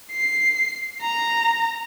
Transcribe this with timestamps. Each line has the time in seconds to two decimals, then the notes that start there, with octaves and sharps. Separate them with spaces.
0.11 C7
1.02 A#5